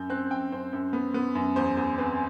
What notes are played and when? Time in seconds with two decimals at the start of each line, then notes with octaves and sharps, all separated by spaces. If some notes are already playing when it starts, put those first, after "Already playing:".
Already playing: F#2 G6
0.10 C4 F#6
0.31 F#2 G5
0.52 F#2 C5
0.73 F#2
0.93 B3
1.14 B3
1.35 F#2
1.56 E2 C5
1.77 E2
1.98 C4 B4